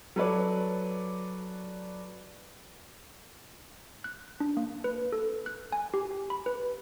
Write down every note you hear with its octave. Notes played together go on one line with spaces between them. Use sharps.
F#3 A4 B4 C#5 D5
F#6
D4
A#3
B4
A4
F#6
G#5
G4
B5
B4